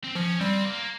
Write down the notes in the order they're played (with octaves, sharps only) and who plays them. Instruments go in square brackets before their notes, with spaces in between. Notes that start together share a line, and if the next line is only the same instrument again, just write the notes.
[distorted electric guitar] C4
[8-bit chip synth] F3 [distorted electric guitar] C#4
[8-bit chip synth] G3 [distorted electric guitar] C4
[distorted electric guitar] A#3